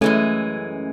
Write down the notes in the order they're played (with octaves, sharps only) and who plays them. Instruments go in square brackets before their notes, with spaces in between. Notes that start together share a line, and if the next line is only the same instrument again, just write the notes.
[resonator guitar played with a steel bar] F#2 E3 G#3 [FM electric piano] A3 C#4